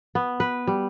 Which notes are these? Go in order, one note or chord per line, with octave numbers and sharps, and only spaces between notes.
B3
B4
G3